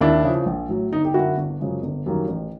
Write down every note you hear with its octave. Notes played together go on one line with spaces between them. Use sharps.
D#2 D4 E4
C#3 F3
A#1
A2 F#3
G1 D#4
G4
F#2 D3 F#3 A#3 E4 F#4
G1
F#2 C#3 F3 G#3
G1
F#2 D#3 G3 A#3
A1